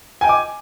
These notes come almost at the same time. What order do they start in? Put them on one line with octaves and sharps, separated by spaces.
G#5 G5 D#5 D6